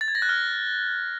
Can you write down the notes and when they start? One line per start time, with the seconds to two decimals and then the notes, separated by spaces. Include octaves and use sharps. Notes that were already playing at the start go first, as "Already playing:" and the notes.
0.01 A6
0.08 G#6
0.15 A#6
0.22 F#6
0.29 F6